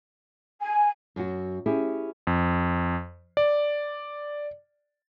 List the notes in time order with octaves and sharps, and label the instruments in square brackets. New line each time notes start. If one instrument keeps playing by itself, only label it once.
[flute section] G#5
[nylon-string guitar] F#2 F#4
C#4 E4 G4 G#4
[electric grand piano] F2
D5